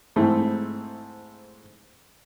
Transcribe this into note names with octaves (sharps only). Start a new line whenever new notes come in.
G#2 A3 C4 E4